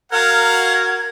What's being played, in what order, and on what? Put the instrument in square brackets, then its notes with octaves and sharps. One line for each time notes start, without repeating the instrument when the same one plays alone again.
[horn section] F#4 A#4 [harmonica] F5 F#5 [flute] G#6